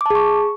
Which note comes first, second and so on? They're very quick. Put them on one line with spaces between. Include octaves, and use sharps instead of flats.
D6 A5 G#4 C#6